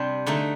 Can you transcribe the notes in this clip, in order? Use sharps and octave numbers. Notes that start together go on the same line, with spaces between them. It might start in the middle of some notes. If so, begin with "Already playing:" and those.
Already playing: C3 G3 D4
D3 A3 D#4